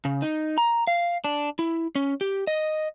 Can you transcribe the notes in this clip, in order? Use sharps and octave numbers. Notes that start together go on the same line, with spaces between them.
C#3
D#4
A#5
F5
D4
E4
C#4
G4
D#5